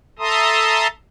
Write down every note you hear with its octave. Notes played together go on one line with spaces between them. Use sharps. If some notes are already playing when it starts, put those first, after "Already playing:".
A4 E5 A5 A#5 C6 D#6